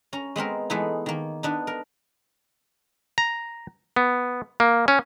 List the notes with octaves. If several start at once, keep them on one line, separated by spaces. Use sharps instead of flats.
C#4 A#5
G#3 B3 C4 A#4
E3 G#3 A3 B3 D#4 E4
D#3 A#3
B3 D4 D#4
A#4
A#5
B3
A#3
C#4